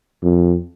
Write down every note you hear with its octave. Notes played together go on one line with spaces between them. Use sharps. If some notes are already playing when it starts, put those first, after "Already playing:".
F2